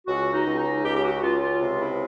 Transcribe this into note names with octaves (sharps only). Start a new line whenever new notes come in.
C#2 F#4
D#4
C#2
D#4
C#2 G4
G4
F#4
C#2 F4
F4
C3
E4